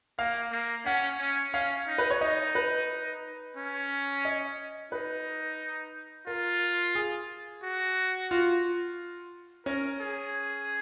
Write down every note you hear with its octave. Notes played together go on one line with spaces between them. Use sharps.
A#3 F5
A#3
C#4 F#5
C#4
C#4 F5
D#4
B4
C#5
D#4 D#5
B4
C#4
D#5
D#4 B4
F4 A#4
G#4
F#4
F4
C#4 A#4
G#4